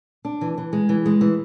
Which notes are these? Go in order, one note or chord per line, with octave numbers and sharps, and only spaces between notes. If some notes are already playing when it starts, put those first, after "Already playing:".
D4
E3
E3
G#3
E3
G#3
E3